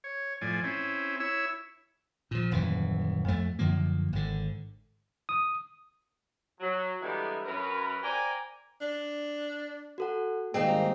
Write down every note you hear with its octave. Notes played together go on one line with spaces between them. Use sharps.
C#5
A2 F3 D5 G#5
C4 C#4 E4
E4 C#5 E6
A#2 F3
D#1 F#2 E3
F2 A3
F#2 D3 F3 A#3
G#1 D3
D#6
F#3
D3 E3 G3 G#3 A#3 B3
F#2 A#4 B4
A#4 C5 D5 G5 G#5 A#5
D4
F#4 A4 F#5
G#1 G3 A#3 C4 D#4 G#4